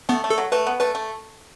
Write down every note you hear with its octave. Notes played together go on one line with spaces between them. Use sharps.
A3 B3
A3
A4
F#3
A3 B4
B3
A3 B4
A3